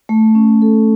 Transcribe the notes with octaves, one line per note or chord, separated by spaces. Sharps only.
A3
C#4
A4